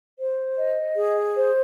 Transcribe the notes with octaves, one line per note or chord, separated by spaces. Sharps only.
C5
D#5
G#4
C5